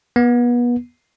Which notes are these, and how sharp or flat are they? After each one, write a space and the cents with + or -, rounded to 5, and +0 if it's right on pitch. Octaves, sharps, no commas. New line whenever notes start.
B3 -30